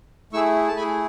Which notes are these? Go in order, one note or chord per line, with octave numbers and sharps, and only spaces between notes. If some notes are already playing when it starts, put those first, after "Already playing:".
A3 E4 G#4 C#6 E6
A5
A3 E4 G#4 G#5 B5